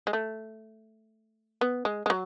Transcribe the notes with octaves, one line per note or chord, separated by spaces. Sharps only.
G#3
A3
B3
G#3
G#3
F#3